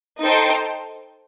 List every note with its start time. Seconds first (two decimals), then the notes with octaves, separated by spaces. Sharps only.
0.21 D#4 A4 C5 G5